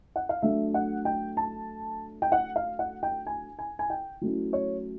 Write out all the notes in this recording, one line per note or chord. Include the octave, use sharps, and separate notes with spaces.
F#5
F5
F#3 A3 D4 E5
F#5
G5
A5
G5
F#5
F5
F#5
G5
G#5
G#5
G#5
G5
F#3 A3 C#4 E4
C#5